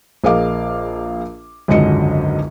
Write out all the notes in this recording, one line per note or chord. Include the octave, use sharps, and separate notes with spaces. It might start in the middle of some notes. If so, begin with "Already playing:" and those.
A#1 G#4 A#4 D#5 F5 D6
G#1 C#2 F#2 D3 D#5 C#7